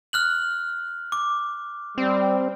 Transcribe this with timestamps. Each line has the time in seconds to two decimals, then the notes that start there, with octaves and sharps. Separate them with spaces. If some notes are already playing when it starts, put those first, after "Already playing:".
0.13 F6 F#6 F#7
1.12 D6
1.98 G3 C4